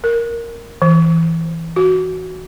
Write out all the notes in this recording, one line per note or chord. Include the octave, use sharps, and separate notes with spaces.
A#4
E3
F#4